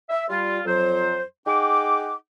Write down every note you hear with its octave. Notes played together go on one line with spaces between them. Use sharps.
E5
G3 F4
F2 F#3 C5
D#4 G#4 F#5 G5 D6